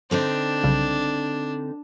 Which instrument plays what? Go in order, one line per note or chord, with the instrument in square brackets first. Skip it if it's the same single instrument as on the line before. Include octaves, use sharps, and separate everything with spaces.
[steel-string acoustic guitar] D3 C4 D#4 [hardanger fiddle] D4
[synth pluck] B1 C#3 G3